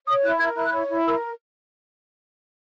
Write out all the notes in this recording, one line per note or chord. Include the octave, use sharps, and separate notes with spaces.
C#5 D#6
E4 F#6
A#4 G#6
E4 F#6
C#5
E4
A#4 E6